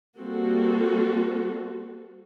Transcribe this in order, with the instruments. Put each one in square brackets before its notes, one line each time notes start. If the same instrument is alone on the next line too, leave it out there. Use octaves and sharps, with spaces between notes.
[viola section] G3 A#3 C4 F#4 A4